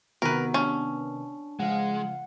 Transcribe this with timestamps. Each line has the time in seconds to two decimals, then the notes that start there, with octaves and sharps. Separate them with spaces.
0.22 C3 D#3 B3 D#4 F#4 A#4 B4
0.54 C#4 D4
1.60 C#3 F3 G#3 F5 F#5